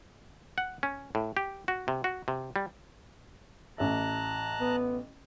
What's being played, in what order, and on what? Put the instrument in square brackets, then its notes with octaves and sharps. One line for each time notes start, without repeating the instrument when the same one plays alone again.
[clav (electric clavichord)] F#5
C#4
A2
G4
F#4
C3
F#4
C3
G3
[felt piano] A1 E5 [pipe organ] A5 A#5 F#6
[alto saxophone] B3